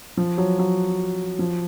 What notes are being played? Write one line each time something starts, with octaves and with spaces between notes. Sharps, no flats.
F3
F#3
F#3
F3